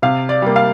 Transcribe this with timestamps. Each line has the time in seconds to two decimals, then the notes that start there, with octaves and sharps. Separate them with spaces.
0.02 C3 F5
0.29 D5
0.42 G3 A#3
0.56 F5